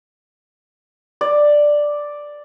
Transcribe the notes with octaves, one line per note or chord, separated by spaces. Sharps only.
D5